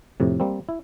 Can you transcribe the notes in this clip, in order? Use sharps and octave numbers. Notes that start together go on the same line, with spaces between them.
F2 A2 C3
G3 A#3 C4
E4